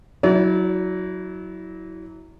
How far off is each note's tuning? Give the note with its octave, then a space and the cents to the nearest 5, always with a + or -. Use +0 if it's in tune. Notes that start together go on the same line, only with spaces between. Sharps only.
F#3 +0 E4 -25 D5 -45